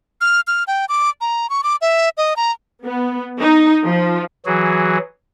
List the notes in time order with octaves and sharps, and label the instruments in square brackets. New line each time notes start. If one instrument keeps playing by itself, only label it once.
[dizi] F6
F6
G5
D6
A#5
C#6
D6
E5
D#5
A#5
[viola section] B3
D#4
F3
[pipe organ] E3 F#3 F#4 G#4